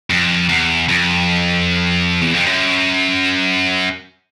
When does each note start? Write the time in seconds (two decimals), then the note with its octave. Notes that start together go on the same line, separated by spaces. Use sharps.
0.10 F2
0.49 E2
0.89 F2
2.21 E2
2.34 F2
2.46 F#2